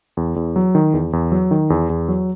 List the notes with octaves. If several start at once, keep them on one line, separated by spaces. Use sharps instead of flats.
E2
E2
F#3
D#3
E2
E2
F#3
D#3
E2
E2
F#3